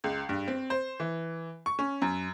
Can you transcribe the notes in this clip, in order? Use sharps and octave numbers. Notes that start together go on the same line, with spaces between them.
C#2
G2
C4
C5
E3
C#6
C#4
F#2